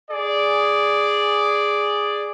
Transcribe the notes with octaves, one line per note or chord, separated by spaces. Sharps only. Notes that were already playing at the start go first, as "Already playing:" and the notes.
G#4 D5